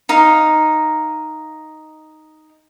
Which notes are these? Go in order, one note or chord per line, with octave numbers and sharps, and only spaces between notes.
D#4 F5